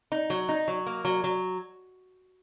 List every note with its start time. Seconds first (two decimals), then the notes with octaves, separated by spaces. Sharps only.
0.12 D#4
0.30 F#3
0.49 D#4
0.68 F#3
0.86 A#3
1.05 F#3
1.24 F#3